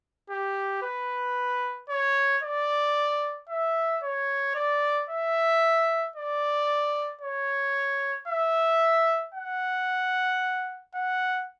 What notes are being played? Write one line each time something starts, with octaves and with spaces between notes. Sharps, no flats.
G4
B4
C#5
D5
E5
C#5
D5
E5
D5
C#5
E5
F#5
F#5